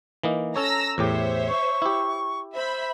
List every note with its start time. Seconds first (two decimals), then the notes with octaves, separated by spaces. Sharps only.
0.24 E3 A#3 D#4
0.56 C#4 A4 C#5 A#5 E6 A#6
0.98 E2 A2 G4 C5 C#5 E5
1.48 C#6
1.82 E4 G4
2.54 C5 E5 B5